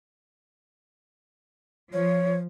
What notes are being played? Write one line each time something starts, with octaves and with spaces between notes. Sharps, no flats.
F3 C#5